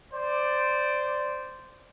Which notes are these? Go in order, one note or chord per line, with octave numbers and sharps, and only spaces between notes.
C5 D5